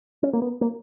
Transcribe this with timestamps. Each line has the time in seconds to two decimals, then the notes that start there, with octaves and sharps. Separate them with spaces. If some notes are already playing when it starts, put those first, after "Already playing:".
0.23 C#4
0.33 A#3
0.42 B3
0.61 A#3